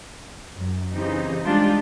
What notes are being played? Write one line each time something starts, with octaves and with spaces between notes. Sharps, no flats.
F#2
C#3 E3 C4 D#4 G4
G3 G#3 D4 D#4 F4 G4